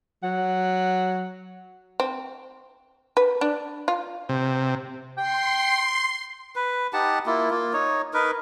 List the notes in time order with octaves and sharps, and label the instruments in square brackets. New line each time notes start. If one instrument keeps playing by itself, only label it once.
[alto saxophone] F#3 [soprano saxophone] F#5
[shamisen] C4
B4
D4
F4
[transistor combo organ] C3
[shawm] G5 [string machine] C6 C7
[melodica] B4
D#4 G4 F#5 A5
A#3 E4 F4
A#3 F4
D#4 C#5
D#4 A#4 B4